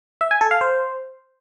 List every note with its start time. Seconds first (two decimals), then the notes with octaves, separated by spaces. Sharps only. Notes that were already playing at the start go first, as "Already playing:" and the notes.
0.21 E5
0.31 G#5
0.41 A4
0.51 F5
0.61 C5